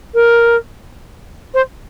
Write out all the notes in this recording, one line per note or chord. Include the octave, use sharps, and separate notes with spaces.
A#4
C5